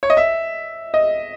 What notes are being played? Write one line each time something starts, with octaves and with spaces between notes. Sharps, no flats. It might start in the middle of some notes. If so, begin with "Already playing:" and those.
C#5
D#5
E5
D#5